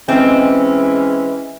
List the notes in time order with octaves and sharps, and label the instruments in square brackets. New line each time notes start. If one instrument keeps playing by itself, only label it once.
[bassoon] E3 [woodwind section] G#3 C#4 [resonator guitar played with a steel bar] C4